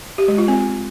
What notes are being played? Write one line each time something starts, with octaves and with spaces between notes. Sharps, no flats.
G4
G#3
F4
C4